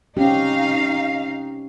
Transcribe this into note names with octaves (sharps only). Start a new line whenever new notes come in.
C4 C#4 D#4 G4 F5